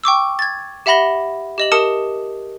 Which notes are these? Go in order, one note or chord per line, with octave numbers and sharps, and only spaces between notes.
G5 C#6 D6 E6
G#6 A6
G4 E5 F#5 B5 A#6 G7
G4 D#5 F#7
G4 A#4 A5 D#6 C#7 E7